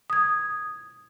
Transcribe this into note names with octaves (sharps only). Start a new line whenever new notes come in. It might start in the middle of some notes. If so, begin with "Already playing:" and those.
D#6 G#6